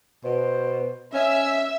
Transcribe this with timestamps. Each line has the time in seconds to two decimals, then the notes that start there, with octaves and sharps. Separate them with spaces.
0.24 B2 C5
1.14 C#4 D#5 E5